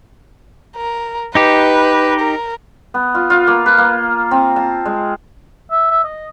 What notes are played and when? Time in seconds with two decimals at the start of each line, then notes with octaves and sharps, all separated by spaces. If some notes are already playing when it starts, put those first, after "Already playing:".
0.76 A#4
1.35 D#4 G4 B4
2.20 A#4
2.94 B3
3.15 F4
3.30 F4
3.47 A#3
3.66 B4
3.78 A#3
4.31 C4
4.56 A5
4.85 G#3
5.71 E5
5.91 E5
6.04 D#5